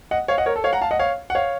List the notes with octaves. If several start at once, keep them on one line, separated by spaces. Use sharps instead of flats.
D#5 F#5
C#5 F5
D#5 F#5
A#4 C#5
A4
C#5 F5
F#5 A#5
F5 A5
D#5 F#5
C#5 F5
F#5
C#5 F5